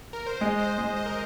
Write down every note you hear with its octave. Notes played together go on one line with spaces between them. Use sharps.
A#4
C5
G#3 D#5
C5
G#3 C5
D#5
A#4